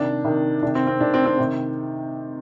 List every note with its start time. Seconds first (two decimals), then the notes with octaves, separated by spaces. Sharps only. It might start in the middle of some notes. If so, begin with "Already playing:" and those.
Already playing: C3 D#3 D4
0.25 C3 D#3
0.62 C3 D#3 D4
0.75 C4
0.87 C4
1.00 C3 D#3 D4
1.14 C4
1.26 C4
1.38 C3 D#3